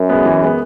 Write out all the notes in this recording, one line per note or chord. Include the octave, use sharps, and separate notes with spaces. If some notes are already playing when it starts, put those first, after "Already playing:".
Already playing: F#2
G#3 B3
E3
G#3 B3